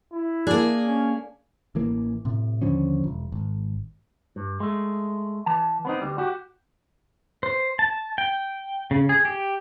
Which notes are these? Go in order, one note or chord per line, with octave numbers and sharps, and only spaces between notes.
E4
A#3 D4 G#4
C#4
A1 E3 A#3
A2 C3
D#2 D3 F3 C#4
E1
G#1
G2
G#3 A3
E3 A5
B3 C4 D#4
D2 G3
F#4 G4
C5
A5
G5
C#3
G#4
G4